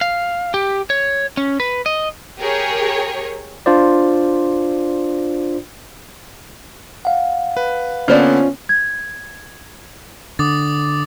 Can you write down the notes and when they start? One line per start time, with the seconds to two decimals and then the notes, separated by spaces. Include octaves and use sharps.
0.01 F5
0.54 G4
0.90 C#5
1.37 C#4
1.60 B4
1.86 D#5
2.39 G4 G#4 A#4 C#5
3.66 D4 F4 C5 D5
7.05 F5 F#5
7.57 B4
8.08 D3 A#3 B3 C#4 F4 C5 D5
8.69 G#6
10.39 D3 D6 D#6 A6